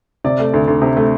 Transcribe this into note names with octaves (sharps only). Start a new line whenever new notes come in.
C3 D5
A3
D2
D2
C3
A3